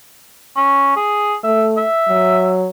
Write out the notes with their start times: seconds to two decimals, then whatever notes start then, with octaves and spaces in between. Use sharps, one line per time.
0.57 C#4
0.97 G#4
1.44 A3 E5
1.77 E5
2.08 F#3